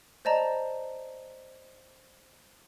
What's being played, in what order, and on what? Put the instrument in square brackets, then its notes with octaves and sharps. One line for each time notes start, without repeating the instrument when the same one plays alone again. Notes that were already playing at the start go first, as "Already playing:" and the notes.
[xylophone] C5 D5 D#5 A5 A#5